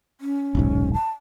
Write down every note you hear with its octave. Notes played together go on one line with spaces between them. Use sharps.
C#4
D#1 B1 G#2
A5